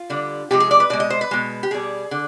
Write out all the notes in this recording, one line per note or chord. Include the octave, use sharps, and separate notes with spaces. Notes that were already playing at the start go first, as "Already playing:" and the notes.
Already playing: F4
D3 G3
C3 F3 G#3 G4
G#4
D5
B4
B2 G#3 D5
D#5
C5
B4
B2 G#3
G4
B2 G3 G#4
D3